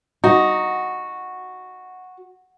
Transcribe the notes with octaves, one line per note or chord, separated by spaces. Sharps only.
D#4 F#4